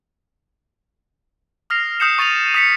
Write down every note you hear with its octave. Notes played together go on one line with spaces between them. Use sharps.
D#6 F6 A#6 C7 F7
D#6 F6 G6 C7 C#7 E7
C#6 A6 D#7 F7 F#7
D#6 B6 C#7